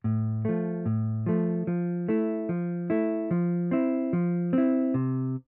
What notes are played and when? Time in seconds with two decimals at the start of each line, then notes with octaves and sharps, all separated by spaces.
0.04 A2
0.45 F3 A3
0.86 A2
1.26 F3 A3
1.67 F3
2.08 A3 E4
2.49 F3
2.90 A3 E4
3.31 F3
3.71 C4 E4
4.13 F3
4.53 C4 E4
4.94 C3